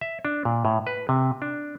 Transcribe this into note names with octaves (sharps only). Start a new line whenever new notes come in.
E5
D4
A#2
A2
B4
C3
D4